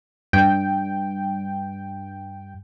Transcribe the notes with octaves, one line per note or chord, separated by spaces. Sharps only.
G2 G5